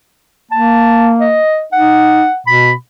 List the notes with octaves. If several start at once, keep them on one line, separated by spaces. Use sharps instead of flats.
A#3 A5
D#5
D#4 F#5
B2 B5